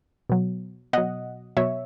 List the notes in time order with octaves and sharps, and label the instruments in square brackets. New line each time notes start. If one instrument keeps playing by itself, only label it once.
[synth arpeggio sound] B2 F#3
B2 F#3 D#5 F#5
B2 F#3 C#5 E5